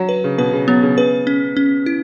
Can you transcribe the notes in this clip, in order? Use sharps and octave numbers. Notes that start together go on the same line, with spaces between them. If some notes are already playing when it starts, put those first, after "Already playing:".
Already playing: F#3 F#4
B4
C#3
B2 B4
C#3
F#3 B3
C#3
C#3 B4
C#4
C#4
E4